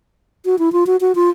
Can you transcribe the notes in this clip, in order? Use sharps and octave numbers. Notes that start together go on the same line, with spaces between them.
F#4
E4
F4
F#4
F#4
F4